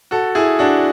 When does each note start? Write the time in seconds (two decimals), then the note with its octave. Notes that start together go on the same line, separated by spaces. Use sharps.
0.11 F#4 A4
0.35 E4 G#4
0.59 D4 F#4